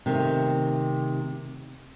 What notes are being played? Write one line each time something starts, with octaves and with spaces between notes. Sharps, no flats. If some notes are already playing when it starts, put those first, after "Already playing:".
C3 D#3 A3